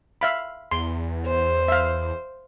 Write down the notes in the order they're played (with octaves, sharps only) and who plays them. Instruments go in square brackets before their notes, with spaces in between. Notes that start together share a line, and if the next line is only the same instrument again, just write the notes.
[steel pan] E5 F5 B5
[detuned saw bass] E2 [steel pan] C6
[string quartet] C5
[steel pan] E5 F5